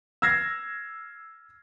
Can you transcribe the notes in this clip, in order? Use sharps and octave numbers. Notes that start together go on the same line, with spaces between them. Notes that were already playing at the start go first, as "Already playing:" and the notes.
E6 F6 G#6 A#6 C7